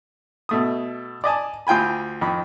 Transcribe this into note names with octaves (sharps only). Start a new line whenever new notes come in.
B2 A3 D#6
D5 D#5 G#5 A5
D2 F4 G5 G#5 B5
F2 D#3 B5